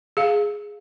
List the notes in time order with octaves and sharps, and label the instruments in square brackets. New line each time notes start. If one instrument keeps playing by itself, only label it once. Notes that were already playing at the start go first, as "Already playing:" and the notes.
[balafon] G#4 F5